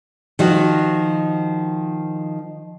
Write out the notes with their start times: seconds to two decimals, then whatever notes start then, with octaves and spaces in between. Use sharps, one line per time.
0.39 D#3 F3 F#4